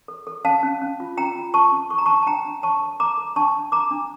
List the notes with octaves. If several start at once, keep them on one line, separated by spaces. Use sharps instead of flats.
A4
A4
C#4 F5 A5
C#4
C#4
F4
C#4 G5 A#5
F4
A4 A5 C#6
C#4
A4 C#6
A#5
D4 A5 C#6
A5
D4 G5 A#5
D4
C#5 A5 C#6
A4
A4 A#5 D6
A4
D4 A5 C#6
D4
A4 A#5 D6
D4